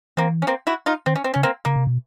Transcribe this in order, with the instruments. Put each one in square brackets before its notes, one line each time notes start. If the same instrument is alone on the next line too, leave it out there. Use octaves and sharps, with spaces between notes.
[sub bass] E3 [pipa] A#3 C4
[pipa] C#4
A#3 C4
E4 F#4
D#4 F4
[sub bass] D#3 [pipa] C4
[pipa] C#4
C4
[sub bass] C#3 [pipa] C#4
[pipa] A#3 C4
[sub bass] C#3 [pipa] A#3
[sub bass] C3
B2